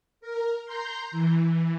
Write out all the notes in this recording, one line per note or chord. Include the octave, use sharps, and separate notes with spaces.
A#4
A#5 C6 G6
E3